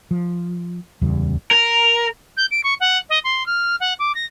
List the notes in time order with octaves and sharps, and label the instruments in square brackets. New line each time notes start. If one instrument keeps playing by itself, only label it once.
[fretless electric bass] F3
D1 E2 C#3 G3
[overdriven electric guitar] A#4
[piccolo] G6
D7
C#6
F#5
D#5
C6
F6
F#5
D6
A#6